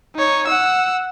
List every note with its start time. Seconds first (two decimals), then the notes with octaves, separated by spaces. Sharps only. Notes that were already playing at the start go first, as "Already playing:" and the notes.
0.15 D#4 C#5
0.47 F#5 E6